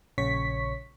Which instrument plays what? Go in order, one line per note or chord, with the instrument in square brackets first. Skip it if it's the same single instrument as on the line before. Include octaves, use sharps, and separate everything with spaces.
[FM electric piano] A#1 C#3 C#5 C#6 B6